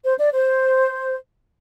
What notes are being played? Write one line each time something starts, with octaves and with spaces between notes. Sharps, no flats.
C5
D5
C5